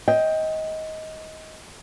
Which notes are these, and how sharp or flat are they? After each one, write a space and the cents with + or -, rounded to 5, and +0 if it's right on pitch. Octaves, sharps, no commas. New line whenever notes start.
D#5 +20 G5 +10